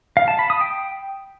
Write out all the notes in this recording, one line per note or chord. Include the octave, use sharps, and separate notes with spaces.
F5
A5
B5
D#6
G5